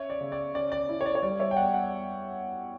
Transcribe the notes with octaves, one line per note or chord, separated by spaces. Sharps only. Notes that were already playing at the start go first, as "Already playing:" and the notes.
Already playing: C#4 C#5 E5
D5
C#3
D5
C#4 D5
D5
E4
C#5
D5
C#5
G3 D5
C#5 E5
G5
E2 D5 F#5
D5 F#5